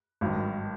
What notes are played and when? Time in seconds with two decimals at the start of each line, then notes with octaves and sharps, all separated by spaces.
0.21 G#1 G2 D#3 F#3